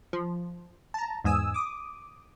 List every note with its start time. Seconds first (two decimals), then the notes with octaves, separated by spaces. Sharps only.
0.13 F3
0.94 A5 A#5
1.24 E2 G#2 G#5 D#6 E6
1.54 D6 D#6